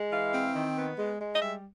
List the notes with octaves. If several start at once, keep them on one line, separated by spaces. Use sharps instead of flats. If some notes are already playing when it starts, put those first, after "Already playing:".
Already playing: G#3
E3 F5
C4
D#3
B3
G#3
G#3
D#5
G3 E5